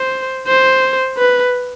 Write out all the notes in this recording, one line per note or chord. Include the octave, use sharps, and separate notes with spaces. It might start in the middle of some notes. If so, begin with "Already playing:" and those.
Already playing: C5
C5
B4